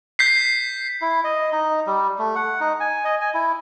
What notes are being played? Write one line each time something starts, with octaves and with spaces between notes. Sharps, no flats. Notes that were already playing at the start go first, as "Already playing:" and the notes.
G6 B6 C7
E4
D#5
D#4
G3
A3
F#5
D#4
G#5
D#5
G#5
E4